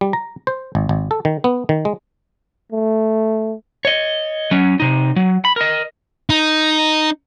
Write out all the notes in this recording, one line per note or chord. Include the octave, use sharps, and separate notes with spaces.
G3
A#5
C5
G#1
G#1
A4
D#3
B3
D#3
G#3
A3
C#5 D#5
F#3 C#4
C3 D#4
F#3
B5
A#4 D#5
D#4